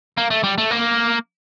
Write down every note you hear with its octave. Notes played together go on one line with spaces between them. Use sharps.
A#3
A3
G3
A3
A#3